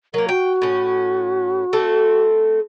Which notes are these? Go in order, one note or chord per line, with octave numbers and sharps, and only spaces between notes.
F#3 A#3 A#4
F#4 G5
A2 C#4
A3 C4 A4